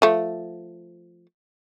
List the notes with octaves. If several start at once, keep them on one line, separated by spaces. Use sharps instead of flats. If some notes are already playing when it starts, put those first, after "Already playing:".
F3 A3